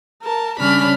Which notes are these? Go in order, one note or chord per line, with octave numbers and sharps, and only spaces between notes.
A#4 A5
C#3 G3 C#4 D4 B5 F6